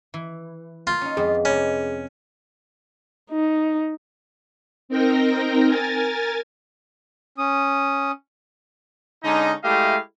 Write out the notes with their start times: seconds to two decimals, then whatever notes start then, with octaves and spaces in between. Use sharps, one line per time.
0.14 E3
0.87 A#3 F4
1.01 C#4 D#4
1.17 F2 G#3 B3 G#4
1.45 C3 G#3 C#4 B4
3.31 D#4
4.89 C4 D#4 A#4 G5 A#6
5.66 A#4 G#5 A6
7.38 C#4 D#6
9.23 D3 G#3 C#4 D#4
9.64 G#3 A3 E4 G4 D#5 F5